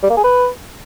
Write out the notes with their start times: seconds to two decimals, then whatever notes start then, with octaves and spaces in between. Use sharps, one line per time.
0.03 G3
0.10 A#3
0.17 G#4
0.24 B4